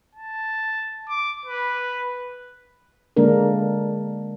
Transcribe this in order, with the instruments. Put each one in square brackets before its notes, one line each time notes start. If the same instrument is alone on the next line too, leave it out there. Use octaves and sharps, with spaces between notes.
[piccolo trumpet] A5
D6
B4
[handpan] D3 G#3 A#3 D4 A#4